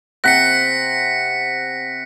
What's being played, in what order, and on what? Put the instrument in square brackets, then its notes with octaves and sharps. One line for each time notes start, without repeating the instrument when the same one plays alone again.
[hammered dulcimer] C3 F#5 [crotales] A#6 B6 C#7